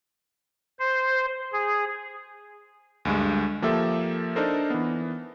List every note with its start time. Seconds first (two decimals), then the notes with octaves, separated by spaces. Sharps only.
0.79 C5
1.53 G#4
3.05 D2 G2 G#3
3.62 F3 A#3 G4 A4 E5
4.36 D4 D#4 A4 A#4 C5
4.70 E3 B3